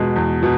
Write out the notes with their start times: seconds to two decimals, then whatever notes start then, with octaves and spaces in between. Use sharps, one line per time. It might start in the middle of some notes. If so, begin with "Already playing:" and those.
Already playing: E2 B2 G#3
0.16 E2
0.43 B2